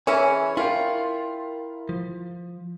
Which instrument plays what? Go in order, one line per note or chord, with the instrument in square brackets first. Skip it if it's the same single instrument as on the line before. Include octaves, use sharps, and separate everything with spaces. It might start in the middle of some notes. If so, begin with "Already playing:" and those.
[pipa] E3 C#4 [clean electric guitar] G#4 E5
[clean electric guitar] E4 A#4 G5 [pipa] F4
[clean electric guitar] F3